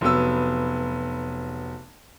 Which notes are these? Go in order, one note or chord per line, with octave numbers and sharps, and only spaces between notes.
F1 F#3 B3 E6